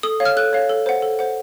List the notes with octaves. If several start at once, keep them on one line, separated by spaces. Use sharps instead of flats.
A4 D#6
C#5 F5
F6
A4 F#6
C#5 F5
A4
C5 F#5
A4
C5 F#5